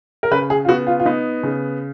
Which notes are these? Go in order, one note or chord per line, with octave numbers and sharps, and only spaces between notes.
A#4
C#3 B4
G#4
F4
B3 F#4
F4
F4
B3 D#4
C#3